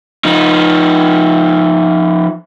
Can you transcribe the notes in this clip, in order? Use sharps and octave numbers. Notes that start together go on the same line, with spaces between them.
F3 D#4